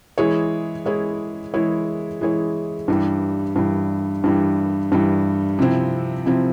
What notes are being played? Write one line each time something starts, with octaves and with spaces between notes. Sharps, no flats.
E3 G#3 E4 G#4 C#5
E3 G#3 E4 G#4 C#5
E3 G#3 E4 G#4 C#5
E3 G#3 E4 G#4 C#5
G2 E3 G3
G2 E3 G3
G2 E3 G3
G2 E3 G3
C3 F3 C4 E4
C3 F3 C4 E4